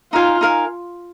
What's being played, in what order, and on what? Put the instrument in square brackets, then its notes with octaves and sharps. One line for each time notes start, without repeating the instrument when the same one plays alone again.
[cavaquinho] D#4 A#4 F5 G#5 [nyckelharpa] F4
[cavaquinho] D#4 A#4 F5 G#5